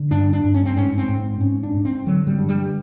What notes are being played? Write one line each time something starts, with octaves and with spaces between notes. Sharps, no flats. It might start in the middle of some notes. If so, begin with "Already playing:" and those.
Already playing: D3
G2 D4
D4
G2
C#4
C4
G#2 C#4
C4
G#2
C4
G#2 C#4
D4
G#2
C4
D3 F#3
G3
G2
G3